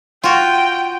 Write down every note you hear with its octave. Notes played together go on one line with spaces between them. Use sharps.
F4 F#4 G5